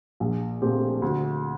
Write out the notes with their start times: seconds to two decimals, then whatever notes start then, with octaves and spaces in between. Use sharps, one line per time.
0.20 A#1
0.62 A#2 A3 C4 G4
1.02 D2